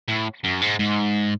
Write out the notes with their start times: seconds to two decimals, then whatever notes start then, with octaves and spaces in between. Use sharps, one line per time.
0.08 A2
0.44 F#2
0.61 G#2
0.79 G#2